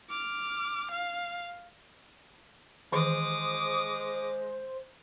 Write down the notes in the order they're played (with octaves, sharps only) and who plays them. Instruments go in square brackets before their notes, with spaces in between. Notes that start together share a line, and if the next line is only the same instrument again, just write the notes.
[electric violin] D6 F6
F5
[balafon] D#3 E3 G#4 [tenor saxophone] G#3 [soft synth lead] C5 [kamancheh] D6 D#6